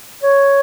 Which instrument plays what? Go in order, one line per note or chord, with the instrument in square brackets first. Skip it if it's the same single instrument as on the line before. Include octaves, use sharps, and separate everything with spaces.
[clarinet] C#5